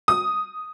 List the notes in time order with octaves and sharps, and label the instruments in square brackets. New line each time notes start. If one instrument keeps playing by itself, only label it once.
[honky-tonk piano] D#6